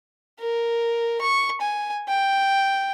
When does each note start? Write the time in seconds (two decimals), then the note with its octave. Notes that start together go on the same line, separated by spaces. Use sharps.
0.40 A#4
1.22 C#6
1.62 G#5
2.09 G5